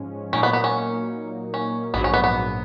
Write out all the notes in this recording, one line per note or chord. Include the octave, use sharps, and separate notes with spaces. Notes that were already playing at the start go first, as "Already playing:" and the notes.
Already playing: G#2 F3 G#3 C#4
A#2 F#3 A#3 C#4 D#4
B3
B3
C#4
C#4
A#1 G#2 F#3 B3
C#4
B3
B3